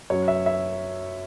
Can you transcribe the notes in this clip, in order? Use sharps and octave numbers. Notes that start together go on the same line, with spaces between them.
F#2 F#3 C#5
E5
E5